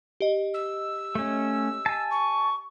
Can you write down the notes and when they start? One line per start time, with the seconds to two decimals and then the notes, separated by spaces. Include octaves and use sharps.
0.20 G4 D#5
0.53 E6
1.15 A3 C#4
1.86 G#5 A5
2.10 C#6